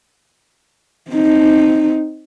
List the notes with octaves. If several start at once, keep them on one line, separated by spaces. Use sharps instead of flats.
C4 D#4